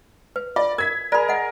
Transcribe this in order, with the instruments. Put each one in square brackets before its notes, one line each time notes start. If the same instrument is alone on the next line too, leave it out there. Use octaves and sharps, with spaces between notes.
[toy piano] B4
[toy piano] F4 [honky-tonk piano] D5
[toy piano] A#4 [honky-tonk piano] G#6 B6
[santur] G#4 A#4 [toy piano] D5 B5
[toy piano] D#5 F#5